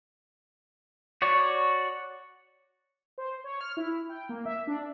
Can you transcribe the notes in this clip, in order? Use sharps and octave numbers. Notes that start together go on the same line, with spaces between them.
F#4 C#5 D5
C5
C#5
F6
E4
G5
A#3
E5
D4